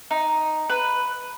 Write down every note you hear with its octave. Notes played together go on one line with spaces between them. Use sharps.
D#4
B4